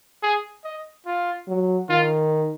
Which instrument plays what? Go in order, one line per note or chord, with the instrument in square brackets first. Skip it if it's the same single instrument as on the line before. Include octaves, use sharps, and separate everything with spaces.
[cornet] G#4
D#5
F4
[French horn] F#3
[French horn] D#3 [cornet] F4